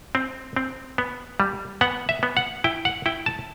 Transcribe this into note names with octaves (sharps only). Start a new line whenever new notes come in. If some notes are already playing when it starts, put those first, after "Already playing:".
C4
C4
B3
G3
B3 F#5
E5
B3
F#5
E4 G5
F#5
E4 G5
A5